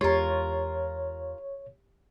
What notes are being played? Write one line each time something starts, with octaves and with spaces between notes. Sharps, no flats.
E2 G#3 F4 G4 A#4 C#5